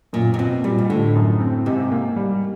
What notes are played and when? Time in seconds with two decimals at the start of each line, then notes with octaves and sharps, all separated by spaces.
0.13 F#2 A#2
0.34 C3
0.38 B2 C4
0.64 A#2 G3
0.78 G#2
0.89 A2 D3
1.15 F#2
1.40 C4
1.66 G#2 C3
1.92 A#3
2.16 G3